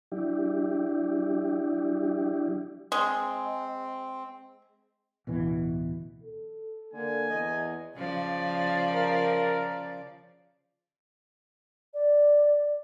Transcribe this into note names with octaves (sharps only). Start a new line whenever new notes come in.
F#3 D4 E4 G4
G#3 C4
D1 B2 E3
A4
D3 A#3 G#5
E2 D#5
C#3 F3 D5
A#4
D5